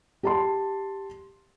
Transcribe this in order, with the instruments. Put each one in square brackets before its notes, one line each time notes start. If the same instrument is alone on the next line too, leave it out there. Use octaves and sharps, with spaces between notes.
[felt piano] G4 A5 C6